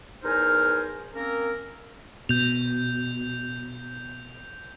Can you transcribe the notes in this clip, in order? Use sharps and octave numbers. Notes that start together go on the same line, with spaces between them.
E2 D#4 A#4 C5 G#5 F6
A#3 C4 C#4 A#4
B2 G6 F7